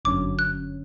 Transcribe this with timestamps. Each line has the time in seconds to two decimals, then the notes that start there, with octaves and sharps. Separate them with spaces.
0.05 G1 F#2 D3 F#3 C#4 D6
0.39 F#6